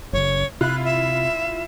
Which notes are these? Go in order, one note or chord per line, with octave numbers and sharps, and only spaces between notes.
F#1 C#3 C#5
C3 E4 F4 F#6
E5